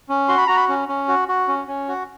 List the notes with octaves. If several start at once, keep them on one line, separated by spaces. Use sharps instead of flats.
C#4
F#4 C6
B5
F#4 A#5
B5
C#4
C#4
F#4
F#4
C#4
C#4
F#4